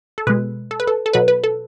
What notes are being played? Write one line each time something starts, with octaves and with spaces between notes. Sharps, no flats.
A4
B2 G#3 B4
A4
B4
A4
A4
B2 F#3 B4
B4
A4